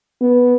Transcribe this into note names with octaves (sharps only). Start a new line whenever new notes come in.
B3